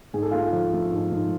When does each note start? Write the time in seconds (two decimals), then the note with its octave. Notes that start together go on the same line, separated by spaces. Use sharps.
0.14 G#2 G#4
0.22 A4
0.31 A3 F4 G#4
0.53 F3
0.73 A3
0.92 G#2
1.11 G#2